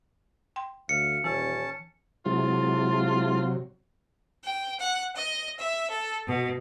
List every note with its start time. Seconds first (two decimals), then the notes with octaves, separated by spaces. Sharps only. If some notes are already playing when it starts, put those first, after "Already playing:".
0.56 G5 C6
0.89 D2 F5 C#7
1.24 D#1 E3 C#4 A5
2.26 C3 F#3 G#3 E4 F4 A5
4.43 G5
4.79 F#5
5.15 D#5
5.59 E5
5.90 A4
6.27 B2